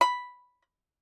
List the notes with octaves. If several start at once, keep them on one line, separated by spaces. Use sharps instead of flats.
B5